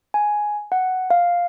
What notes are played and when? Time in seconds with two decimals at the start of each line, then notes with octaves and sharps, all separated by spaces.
0.14 G#5
0.72 F#5
1.11 F5